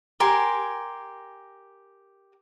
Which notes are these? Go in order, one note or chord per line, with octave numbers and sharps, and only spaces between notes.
G4 A#4 G#5 C6